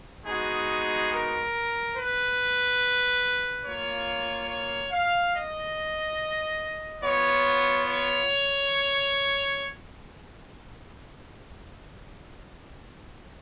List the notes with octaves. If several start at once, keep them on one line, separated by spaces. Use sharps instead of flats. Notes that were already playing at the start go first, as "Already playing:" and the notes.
G#3 B3 D#4 F#4 G#4
A#4
B4
A#3 F4 C#5
C#5
F5
D#5
B3 F4 C#5
C#5